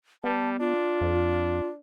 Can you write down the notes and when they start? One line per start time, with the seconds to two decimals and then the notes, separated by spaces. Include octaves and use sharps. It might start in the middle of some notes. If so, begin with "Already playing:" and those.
0.24 G3 B3 A5
0.60 D4 F4
1.01 F2